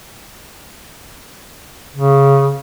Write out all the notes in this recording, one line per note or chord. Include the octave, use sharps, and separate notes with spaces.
C#3